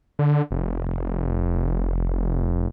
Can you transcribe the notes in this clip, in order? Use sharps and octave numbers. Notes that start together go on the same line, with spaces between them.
D3
F1